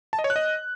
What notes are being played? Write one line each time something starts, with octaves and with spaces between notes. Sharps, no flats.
A5
D#5
C#5
F#6
D#5